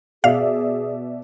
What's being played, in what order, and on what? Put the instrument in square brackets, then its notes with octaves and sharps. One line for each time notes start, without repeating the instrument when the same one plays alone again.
[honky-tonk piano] B2 D5 E5 [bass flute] G#4 [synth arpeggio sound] F5